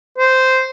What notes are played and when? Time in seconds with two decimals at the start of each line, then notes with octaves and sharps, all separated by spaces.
0.18 C5